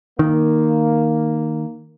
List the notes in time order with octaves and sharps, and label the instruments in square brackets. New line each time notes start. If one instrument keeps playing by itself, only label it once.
[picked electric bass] D#3 [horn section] A#3